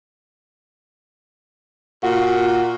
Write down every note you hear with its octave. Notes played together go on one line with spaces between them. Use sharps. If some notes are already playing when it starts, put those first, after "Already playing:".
A#2 F#4